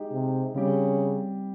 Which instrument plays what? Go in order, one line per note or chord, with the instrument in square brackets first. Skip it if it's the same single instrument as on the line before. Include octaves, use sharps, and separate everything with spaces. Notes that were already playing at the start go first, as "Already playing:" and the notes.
Already playing: [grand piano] G#3 D#4 G4
[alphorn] C3
[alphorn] C#3 [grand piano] G3 C4 G4